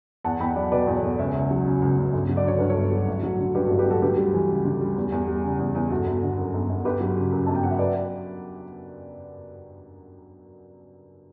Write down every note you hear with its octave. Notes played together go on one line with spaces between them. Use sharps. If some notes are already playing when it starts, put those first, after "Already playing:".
E2 F#5 A5
E2 G5 B5
F#3 D5 F#5
B2 B4 D5
E2
A4 C#5
E2
C#2 C#5 E5
C#2
F#3
C#3
C#2
C#2
G1
F#3
D5
D3 C#5
G2 B4
A4 C#5
G1
F#3
A1
F#3
D3
G2 G4 B4
A1 F#4 A4
G4 B4
F#3 F#4 A4
D2 G4 B4
G3
E3
C#3
D2
G3
E2
E2
G3
C#3
E2
E2
G1 F#4 A4
G1
D3
F#2
G1
G1
G1 G4 B4
F#3
C#3
F#2
G1 A5
G5
F#3 F#5
E5
B4 D5